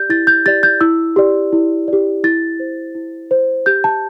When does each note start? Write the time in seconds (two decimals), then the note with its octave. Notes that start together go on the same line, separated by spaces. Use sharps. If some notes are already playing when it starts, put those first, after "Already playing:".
Already playing: G4 D5 G6
0.09 E4 A6
0.27 G6
0.46 G4 D5 A6
0.63 G6
0.81 E4 E6
1.16 G4 D5
1.53 E4
1.88 G4 D5
2.24 E4 A6
2.60 C5
2.95 E4
3.31 C5
3.66 G4 G6
3.84 A5